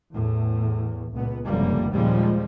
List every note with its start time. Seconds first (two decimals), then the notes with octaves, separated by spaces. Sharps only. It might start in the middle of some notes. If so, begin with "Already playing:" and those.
0.15 E2 A2
1.13 C#2 A#2 B3
1.45 F1 C#2 F#2 D3 G3 A#3
1.91 D#2 A#2 C#3 F3 G3 G#3